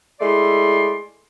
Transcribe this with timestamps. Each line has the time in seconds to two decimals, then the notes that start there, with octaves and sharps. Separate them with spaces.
0.20 G#3 A3 E4 D5 C6